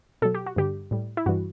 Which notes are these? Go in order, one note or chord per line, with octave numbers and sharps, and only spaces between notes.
B2 F#3 A4
G4
F#4
G2 D3 G3 G4
A2 G3
E4
G2 E3 G3 F#4